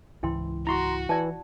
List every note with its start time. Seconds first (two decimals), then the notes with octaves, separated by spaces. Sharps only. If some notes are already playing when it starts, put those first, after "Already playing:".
0.23 C#2 G#2 E3 E4 G5 C6
0.67 E4 F#4 A#5 C6 C#6
1.09 E3 D5 A5